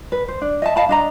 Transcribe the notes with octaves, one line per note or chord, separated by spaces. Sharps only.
B4
C5
D4
D#5 E5 A5
D#5 F5 A5 B5
D4 D#5 A#5